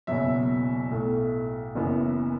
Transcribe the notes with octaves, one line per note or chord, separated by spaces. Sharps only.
F#1 E2 B2 F#3 E5
B1 A2 A3
F#1 F#2 E3 B3